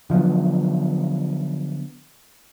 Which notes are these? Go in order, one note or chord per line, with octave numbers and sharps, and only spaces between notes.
D3 F3 F#3 B3